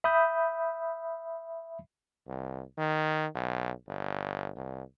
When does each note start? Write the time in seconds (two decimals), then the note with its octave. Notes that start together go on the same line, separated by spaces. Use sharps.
0.04 E5 B5 D#6 G6
2.27 C2
2.78 D#3
3.35 B1
3.88 G1
4.56 C2